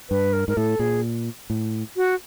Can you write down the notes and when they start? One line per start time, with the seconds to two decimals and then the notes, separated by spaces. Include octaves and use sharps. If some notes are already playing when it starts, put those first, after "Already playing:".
0.10 G2 B4
0.33 A#4
0.48 G#2 A#4
0.57 A2 A4
0.79 A#2 G#4
1.50 A2
1.96 F#4